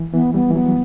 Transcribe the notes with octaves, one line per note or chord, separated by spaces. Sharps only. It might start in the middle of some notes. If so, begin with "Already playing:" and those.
Already playing: E3
E3 B3
G3 B3
E3
F#3 B3